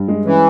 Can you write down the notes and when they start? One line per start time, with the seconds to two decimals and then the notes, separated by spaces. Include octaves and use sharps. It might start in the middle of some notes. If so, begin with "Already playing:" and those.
Already playing: G2
0.08 G#3
0.25 E3 C#4